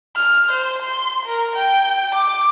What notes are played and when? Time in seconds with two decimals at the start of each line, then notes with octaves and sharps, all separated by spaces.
0.16 F6
0.49 C5
0.82 C6
1.26 A#4
1.56 G5
2.15 D6